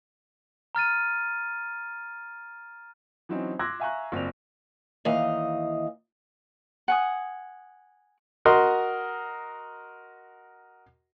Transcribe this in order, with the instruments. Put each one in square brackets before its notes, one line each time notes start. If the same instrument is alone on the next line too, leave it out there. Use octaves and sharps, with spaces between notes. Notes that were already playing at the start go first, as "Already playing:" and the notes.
[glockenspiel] A#5 F6 A6 D#7
[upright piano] E3 F#3 C4 C#4 D#4
C6 D6 E6 F#6 G#6 A#6
E5 F5 G#5 A#5 C#6 F#6
F#1 C4 F4 D5 F7
[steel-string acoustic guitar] D#2 E3 D#4 D#5 F5
[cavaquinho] F#5 G#5 D#6
[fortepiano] F#4 A#4 D#5 C6